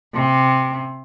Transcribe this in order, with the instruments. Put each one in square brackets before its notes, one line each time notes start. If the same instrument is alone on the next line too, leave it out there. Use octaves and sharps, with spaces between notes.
[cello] C3